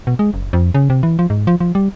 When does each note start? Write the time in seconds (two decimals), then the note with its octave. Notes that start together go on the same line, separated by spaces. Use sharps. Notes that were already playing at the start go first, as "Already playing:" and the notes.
0.07 B2
0.19 G#3
0.34 F#1
0.53 F2
0.75 C#3
0.90 C3
1.03 E3
1.19 F3
1.30 G#2
1.47 F3
1.60 F3
1.75 G3